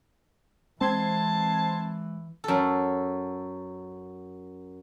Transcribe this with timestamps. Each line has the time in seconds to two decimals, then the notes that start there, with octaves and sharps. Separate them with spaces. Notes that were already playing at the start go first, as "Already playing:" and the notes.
0.81 E3 G#3 C4 A5 C6 G#6
2.44 F#2 A4